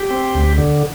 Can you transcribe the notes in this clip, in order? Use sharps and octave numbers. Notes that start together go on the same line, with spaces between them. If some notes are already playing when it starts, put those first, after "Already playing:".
Already playing: G4
C4
D2
D3